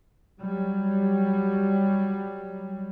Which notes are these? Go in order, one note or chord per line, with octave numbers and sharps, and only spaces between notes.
F#3 G3